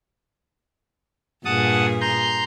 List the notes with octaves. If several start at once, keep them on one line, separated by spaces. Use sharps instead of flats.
G2 A#2 G#4 F#5 A5 D#6
A#5 C6 G6